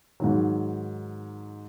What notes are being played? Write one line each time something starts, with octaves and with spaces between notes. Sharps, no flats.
G#2 D#3 F#3